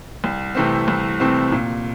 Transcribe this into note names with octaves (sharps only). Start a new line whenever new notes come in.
C2
C3 E3 A3 C4
C2
C3 E3 A3 C4
A#2